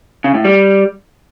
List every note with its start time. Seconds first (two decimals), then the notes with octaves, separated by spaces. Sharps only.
0.24 C#3
0.34 A2
0.44 G3